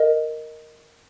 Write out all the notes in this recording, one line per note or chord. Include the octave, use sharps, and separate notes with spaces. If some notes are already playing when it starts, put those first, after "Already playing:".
Already playing: A#4 D#5